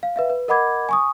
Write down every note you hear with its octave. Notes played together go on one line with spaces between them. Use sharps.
F5
B4 E5 F5
B4
A#4 D#5 F#5 B5 D6 G#6
G#5 C#6 D#6